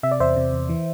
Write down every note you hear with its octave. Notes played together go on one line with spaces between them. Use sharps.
C3 E5
D5
E2 C5 E5
C3
E2
E3